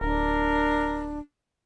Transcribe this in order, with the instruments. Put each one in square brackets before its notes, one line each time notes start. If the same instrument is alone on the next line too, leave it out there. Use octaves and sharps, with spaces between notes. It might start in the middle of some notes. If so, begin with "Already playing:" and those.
[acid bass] D1 [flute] D4 [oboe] A#4